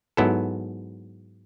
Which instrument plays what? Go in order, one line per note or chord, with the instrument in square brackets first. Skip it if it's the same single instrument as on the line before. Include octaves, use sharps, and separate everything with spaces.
[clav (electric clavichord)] G#2 F#3 B3 E4 A4